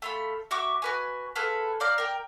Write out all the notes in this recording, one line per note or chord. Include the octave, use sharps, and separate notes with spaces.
A3 F4 B5
F#4 E5 C#6 D6
F#4 B4 G#5
F4 G#4 A4 B4
C5 D5 F5 A#5
A#4 G5